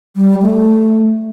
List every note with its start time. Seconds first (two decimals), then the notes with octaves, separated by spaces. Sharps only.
0.16 G3
0.42 A3